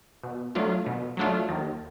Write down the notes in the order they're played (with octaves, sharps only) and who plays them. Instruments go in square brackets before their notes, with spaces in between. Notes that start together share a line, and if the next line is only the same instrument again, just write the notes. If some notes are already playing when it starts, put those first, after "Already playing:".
[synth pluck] B2
F#3 A3 D4 F4
B2
F#3 A3 D4 F4
D#2